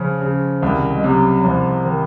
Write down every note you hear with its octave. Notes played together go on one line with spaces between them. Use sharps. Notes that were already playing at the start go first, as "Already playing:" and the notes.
Already playing: C#3 F3 C#4
C#3
C2 D#3
G#3
C3 F#3
C2 F3
D#3